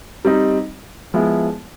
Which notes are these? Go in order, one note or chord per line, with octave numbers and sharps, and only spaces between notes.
G3 C4 D#4
F3 G#3 B3 E4